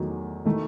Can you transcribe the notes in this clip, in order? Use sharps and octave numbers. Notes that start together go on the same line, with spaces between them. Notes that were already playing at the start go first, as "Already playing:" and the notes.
Already playing: E2 D#3 F#3 A3
D#3 A3